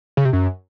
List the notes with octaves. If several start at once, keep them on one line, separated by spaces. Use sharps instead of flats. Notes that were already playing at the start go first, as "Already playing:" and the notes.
C#3
C3
F#2